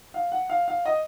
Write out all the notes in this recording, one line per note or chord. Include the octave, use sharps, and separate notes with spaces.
F5
F#5
F5
F5
D#5